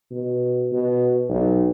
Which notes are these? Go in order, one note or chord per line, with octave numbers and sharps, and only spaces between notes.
B2
B2
B1